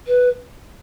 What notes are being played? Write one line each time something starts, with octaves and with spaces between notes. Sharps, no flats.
B4